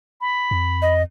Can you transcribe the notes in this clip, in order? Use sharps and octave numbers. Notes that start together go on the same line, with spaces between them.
B5
F2
D#5